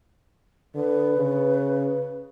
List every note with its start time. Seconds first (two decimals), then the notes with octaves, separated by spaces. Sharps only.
0.75 D3 B4
1.18 C#3